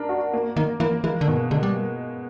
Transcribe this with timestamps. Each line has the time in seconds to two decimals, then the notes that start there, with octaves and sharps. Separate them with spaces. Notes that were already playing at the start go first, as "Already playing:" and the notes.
Already playing: D4 A#4
0.09 F#4
0.33 A#3
0.56 D#3 A#3
0.80 E3 A#3
1.04 E3 G#3
1.21 D3
1.28 B2 D#3
1.51 D3 G#3
1.63 G3